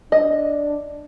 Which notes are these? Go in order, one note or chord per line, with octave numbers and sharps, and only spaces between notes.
D4 D#5